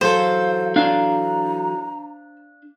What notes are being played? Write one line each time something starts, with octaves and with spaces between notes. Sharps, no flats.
E3 F#3 A4 C5 F5
D4 F5 A#5